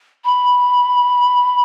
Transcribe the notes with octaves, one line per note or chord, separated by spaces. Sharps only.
B5